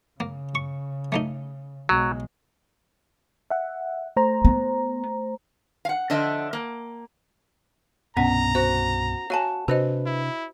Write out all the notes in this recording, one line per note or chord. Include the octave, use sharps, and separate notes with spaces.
C#3 A#3
C#6
A3 A#3 D#4
B1 F#3 G#3
E5 F#5
A3 C5 A#5
B3
F5 F#5
D3 F3 D4 D#5 E5
A#3
C2 G2 B2 B3 C#4 F#5 A#5
F#4 C5
F#4 C#5 F5 G#5 A5
C3 D4 F#4 B4 C5 D#5
E4